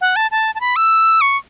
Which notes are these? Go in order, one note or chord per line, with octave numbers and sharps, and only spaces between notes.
F#5
A5
A5
A5
B5
E6
C#6